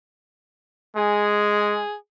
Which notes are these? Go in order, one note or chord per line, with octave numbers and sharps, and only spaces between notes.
G#3 G#4